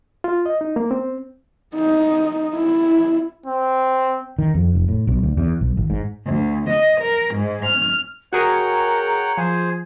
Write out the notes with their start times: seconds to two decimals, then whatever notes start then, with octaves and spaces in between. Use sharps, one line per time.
0.24 F4
0.46 D#5
0.61 D#4
0.76 A#3
0.91 C4
1.75 D#4
2.55 E4
3.46 C4
4.39 D#3
4.54 F2
4.75 F1
4.88 A2
5.07 B1
5.23 D2
5.37 E2
5.61 B1
5.77 G#1
5.90 G#2
6.26 D2
6.69 D#5
7.01 A#4
7.35 G#2
7.65 F6
8.33 F#4 G#4 A#4 C#5 F#5 G5 A#5
9.37 F3 G#4 C5 G#5